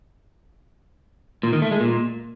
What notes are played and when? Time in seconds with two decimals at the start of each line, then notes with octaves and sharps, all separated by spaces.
1.43 A#2
1.53 D#3
1.62 A3
1.71 G#3
1.81 A#2